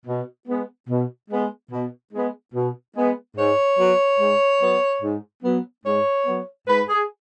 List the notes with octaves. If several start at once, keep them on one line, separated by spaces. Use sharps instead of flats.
B2
G#3 B3
B2
G#3 B3
B2
G#3 B3
B2
G#3 B3
G#2 C#5
F#3 B3
G#2
F#3 B3
G#2
F#3 B3
G#2 C#5
F#3 B3
G#2 B4
G#4